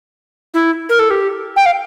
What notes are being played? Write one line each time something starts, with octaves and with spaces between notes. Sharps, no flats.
E4
A#4
A4
G4
G5
F5